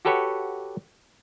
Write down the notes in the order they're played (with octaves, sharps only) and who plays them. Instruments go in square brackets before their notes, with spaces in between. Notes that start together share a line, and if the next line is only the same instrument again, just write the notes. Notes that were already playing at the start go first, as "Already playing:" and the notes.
[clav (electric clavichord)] F#4 G4 A4 B4 C#5 F#5